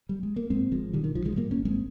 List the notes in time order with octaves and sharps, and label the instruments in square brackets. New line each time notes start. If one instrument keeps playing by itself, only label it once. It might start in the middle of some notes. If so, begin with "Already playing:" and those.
[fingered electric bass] G3
G#3
A#3
G#2 G#3 C4
G#1 F3 G#3
A#2 D#3 G3
D#3
A#1 F3
F3 G#3
G#2 G3 A#3
A#3 C#4
G#1
G#3 C4